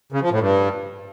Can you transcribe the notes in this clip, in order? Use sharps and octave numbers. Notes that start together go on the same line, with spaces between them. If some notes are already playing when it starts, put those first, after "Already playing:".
C#3
F3
A2
G2